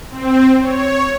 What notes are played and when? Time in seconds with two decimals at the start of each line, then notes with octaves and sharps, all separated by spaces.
0.10 C4
0.61 C#5